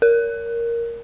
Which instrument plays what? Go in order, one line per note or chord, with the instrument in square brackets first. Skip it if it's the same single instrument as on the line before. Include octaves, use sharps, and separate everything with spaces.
[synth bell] A#4